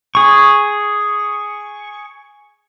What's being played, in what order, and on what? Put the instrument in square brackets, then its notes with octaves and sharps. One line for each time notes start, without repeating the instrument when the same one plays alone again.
[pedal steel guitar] G#4 C#6